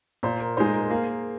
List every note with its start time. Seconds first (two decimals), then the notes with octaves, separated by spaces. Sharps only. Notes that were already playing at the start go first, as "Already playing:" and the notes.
0.23 A#2 C5
0.40 A#4
0.57 G#3 D#4 C5
0.74 A#4
0.90 A#3 G#4